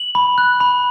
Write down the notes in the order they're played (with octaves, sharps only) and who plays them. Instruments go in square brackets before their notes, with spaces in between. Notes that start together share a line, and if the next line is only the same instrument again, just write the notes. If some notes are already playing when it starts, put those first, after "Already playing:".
Already playing: [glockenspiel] F#7
B5
F#6
B5